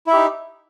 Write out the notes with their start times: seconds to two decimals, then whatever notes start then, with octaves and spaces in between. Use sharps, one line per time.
0.07 E4
0.10 E5
0.13 G4
0.16 D#4